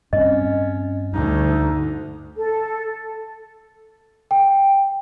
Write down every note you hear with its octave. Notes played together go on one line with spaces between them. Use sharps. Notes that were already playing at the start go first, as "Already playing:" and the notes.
G2 C4 C#4 D#5
D2 G2 D#4
A4
G5